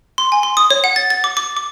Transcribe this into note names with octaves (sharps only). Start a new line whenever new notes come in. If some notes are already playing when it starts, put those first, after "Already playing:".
C6
G#5
C6
D#6
C#5
F#5
A6
A6
D6
D6
D6